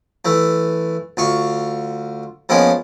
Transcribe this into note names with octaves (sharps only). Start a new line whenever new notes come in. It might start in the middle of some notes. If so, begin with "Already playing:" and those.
E3 A3
D2 F4 C#6
F3 G#3 A#3 B3 C#4